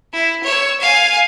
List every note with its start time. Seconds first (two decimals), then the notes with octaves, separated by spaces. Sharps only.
0.14 E4
0.44 C#5 E6
0.81 F5 G#5